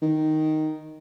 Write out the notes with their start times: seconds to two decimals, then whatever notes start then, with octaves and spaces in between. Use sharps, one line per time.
0.02 D#3